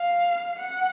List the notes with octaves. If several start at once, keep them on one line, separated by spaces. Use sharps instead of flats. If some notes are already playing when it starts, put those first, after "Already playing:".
Already playing: F5
F#5